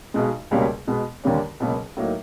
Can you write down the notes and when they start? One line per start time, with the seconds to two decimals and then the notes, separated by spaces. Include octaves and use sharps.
0.14 B1 B2 G#3
0.51 C#2 B2 G3 A#3 C#4
0.87 B2 G#3 B3
1.24 D#2 D3 G3 A#3 C#4
1.60 C#2 B2 F#3 A#3
1.97 A2 F#3 A#3 D#4